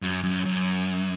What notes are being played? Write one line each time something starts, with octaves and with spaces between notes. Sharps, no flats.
F#2
F#2
F#2